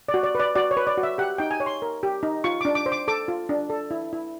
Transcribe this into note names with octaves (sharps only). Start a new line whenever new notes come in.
D5
F#4
D5
B4 D5
F#4 D5
C#5
B4
D5
F#4
E5
G4 F#5
D#4 G5
G#5
C#5
C6
A#4
G4
D#4
F4 C#6
D4 D6
D6
C5
D6
A4 D6
F4
D4
A4
E4
E4